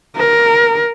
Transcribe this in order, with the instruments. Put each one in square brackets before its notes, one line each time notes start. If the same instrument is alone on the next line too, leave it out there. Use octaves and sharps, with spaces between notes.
[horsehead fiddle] A#4